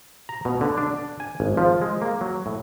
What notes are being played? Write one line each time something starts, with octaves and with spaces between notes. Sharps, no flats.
A#5
B2
D3
D4
G#5
G#1
F3
G#3
A#3
F#3
A2